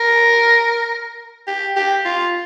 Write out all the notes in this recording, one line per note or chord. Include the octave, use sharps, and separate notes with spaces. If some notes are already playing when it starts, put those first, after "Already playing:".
Already playing: A#4
G4
G4
F4